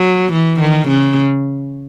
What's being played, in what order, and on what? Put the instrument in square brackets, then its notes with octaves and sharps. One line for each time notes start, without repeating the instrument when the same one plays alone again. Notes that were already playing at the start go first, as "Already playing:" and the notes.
Already playing: [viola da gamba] F#3
E3
D#3
C#3